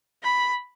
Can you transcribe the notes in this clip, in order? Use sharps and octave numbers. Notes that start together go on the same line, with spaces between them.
B5